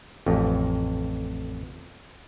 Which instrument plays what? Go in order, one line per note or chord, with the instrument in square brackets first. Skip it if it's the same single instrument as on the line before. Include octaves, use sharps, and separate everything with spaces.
[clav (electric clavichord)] A1 F2